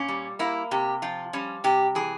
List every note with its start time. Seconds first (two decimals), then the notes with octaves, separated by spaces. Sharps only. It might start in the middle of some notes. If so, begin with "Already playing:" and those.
Already playing: A#2 C#4
0.08 G3
0.39 A#3 E4
0.71 C3 G4
1.02 F3 F4
1.33 G3 C#4
1.64 C3 G4
1.95 E3 G#4